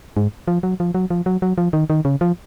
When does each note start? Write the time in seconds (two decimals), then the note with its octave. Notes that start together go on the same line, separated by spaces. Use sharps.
0.17 G#2
0.48 F3
0.63 F#3
0.80 F3
0.95 F#3
1.10 F3
1.26 F#3
1.42 F#3
1.58 F3
1.73 D#3
1.90 D#3
2.05 C#3
2.21 F3